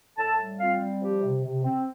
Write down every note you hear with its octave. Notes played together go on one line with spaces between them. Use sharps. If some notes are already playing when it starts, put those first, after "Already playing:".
A2 A4 A5
G3
C4 F4 F5
G3
F3 G4
C3
C3
C4